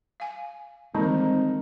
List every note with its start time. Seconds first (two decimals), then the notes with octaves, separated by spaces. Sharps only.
0.20 F5 G#5
0.94 D#3 E3 G3 G#3 A#3 C4 D#4